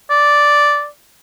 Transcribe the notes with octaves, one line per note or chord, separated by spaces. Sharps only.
D5